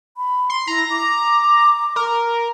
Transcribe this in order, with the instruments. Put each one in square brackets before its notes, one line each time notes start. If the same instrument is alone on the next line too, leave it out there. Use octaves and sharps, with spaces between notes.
[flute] B5
[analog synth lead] C6
[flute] E4 [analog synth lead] A#5
[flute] D6
[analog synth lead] A#4